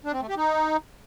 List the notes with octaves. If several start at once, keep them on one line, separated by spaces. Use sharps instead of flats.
D4
C4
A3
G4
D#4